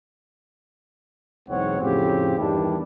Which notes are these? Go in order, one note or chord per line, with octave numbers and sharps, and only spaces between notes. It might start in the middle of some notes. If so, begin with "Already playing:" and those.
B1 E2 G#2 C4 C#5 F#5
F2 A2 C#3 C4 G4
E2 G2 D#3 G3 D4 E4